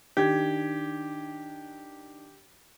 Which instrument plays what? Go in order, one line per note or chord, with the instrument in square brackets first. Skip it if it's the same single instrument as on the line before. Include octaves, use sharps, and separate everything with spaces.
[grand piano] D#3 D4 G#6 [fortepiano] G4